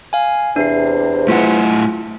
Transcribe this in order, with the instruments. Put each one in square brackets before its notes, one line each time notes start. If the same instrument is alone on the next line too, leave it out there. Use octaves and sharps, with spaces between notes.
[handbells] F5 G#5
[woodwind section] E2 C3 [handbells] D4 C7
[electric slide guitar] A3 E4 F#5 [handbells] F4